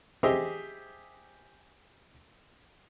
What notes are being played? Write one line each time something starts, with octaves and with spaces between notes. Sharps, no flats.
G4 G#4 C5 D#5 E5